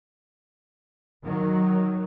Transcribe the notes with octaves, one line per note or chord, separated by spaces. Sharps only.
D#3 F#3